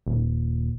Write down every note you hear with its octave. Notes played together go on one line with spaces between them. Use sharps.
D#1